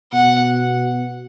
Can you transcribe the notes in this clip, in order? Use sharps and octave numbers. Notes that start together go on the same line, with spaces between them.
B2 F#5